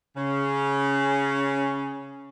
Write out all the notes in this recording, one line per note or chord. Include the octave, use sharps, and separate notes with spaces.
C#3 C#4